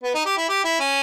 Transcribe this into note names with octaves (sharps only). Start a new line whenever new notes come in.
B3
D#4
G4
E4
G4
E4
C#4